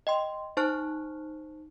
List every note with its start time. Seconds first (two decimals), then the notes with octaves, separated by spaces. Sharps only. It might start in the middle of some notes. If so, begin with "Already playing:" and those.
0.07 D#5 G5 C6
0.57 D#4 C5 A5 C#6 F6 F#6